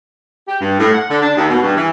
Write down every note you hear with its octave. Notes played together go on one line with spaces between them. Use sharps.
G4
G2
A2
F#5
D3
D4
D#2
B2
G2
E3